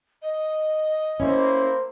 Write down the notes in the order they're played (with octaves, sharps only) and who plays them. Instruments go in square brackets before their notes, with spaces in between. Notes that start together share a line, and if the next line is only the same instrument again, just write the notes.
[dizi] D#5
[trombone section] A#3 E4 [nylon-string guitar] C#4 [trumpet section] C5